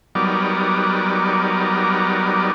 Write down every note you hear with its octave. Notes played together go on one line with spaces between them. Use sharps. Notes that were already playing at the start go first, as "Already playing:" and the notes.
F#3 G3 B3 D#4 A#4 D5